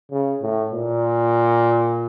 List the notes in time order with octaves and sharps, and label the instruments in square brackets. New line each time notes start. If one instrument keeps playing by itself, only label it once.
[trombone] C#3
A2
A#2